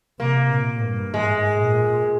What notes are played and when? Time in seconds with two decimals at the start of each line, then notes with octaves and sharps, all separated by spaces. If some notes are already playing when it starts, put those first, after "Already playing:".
0.20 C3 A#3
0.50 A#2
0.83 G2
1.14 G#2 G#3
1.60 A#2